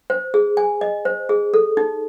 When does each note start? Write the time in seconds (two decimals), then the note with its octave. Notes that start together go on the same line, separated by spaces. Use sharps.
0.10 C5
0.34 G#4
0.57 G#5
0.81 D#5
1.05 C5
1.29 G#4
1.54 A4
1.77 D#4